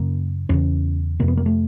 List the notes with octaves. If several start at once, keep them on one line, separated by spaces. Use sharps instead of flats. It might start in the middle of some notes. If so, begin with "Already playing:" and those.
Already playing: F#2 C#3 A#3
E2 C#3 C#4
F2 C3 A#3
B3
A#3
A3